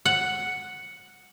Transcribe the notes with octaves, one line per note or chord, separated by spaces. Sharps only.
F#5